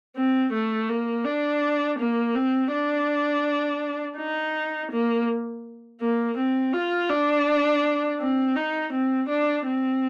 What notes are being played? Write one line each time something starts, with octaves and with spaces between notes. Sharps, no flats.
C4
A3
A#3
D4
A#3
C4
D4
D#4
A#3
A#3
C4
F4
D4
C4
D#4
C4
D4
C4